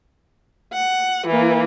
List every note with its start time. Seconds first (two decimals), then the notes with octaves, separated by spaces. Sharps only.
0.73 F#5
1.27 E3 A#3